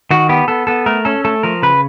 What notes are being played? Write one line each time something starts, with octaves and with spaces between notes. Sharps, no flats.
D#3 F#4
B3 G4
B3 A4
B3 A4
A3 A#4
C#4 A4
A3 A4
F3 A#4
C#3 B4